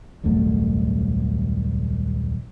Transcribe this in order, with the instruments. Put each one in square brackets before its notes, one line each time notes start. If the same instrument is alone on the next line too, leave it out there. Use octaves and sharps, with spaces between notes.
[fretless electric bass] D#1 C2 F#2 A3